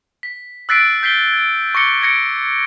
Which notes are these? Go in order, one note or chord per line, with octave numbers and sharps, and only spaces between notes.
B6
E6 F#6 A6 B6 C7 D7
G6 B6 C7 D7 G7
G#6 D7
C#6 D6 A#6 C#7 G7
G#6 A#6 C#7 D7